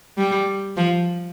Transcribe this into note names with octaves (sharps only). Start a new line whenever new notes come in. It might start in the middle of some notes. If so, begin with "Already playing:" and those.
G3
F3